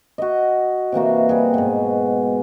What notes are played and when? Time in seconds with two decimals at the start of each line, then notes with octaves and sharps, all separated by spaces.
0.18 F#4 D#5
0.92 C3 E3 A#3 F#4
1.29 G3 F#4 G#4
1.54 G#2 B2